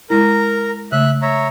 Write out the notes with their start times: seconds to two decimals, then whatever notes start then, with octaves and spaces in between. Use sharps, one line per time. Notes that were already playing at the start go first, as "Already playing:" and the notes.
0.10 G#3 E4 A#4 A#5
0.92 C#3 A3 E5 F#6
1.22 C#5 E5 A#5